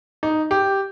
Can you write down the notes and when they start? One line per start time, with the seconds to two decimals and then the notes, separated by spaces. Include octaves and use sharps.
0.23 D#4
0.51 G4